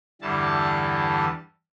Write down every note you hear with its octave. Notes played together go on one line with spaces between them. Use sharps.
E2 G2 D3 E3 G3 A5